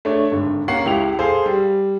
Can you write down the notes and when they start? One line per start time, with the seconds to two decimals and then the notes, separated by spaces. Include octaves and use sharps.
0.05 A3 D4 C#5
0.31 G#1 D3
0.68 A#3 C#4 F#5 C#6 C7
0.85 C#2 E4 G4 F#5 F7
1.19 G#4 A4 C5 F5
1.46 G3